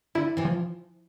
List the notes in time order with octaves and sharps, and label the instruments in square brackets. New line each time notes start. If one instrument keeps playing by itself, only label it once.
[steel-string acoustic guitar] D3 [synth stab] E4
[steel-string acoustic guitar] C3 E3
[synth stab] F3